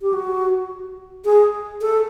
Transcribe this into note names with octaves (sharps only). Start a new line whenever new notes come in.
G4
F#4
G#4
A4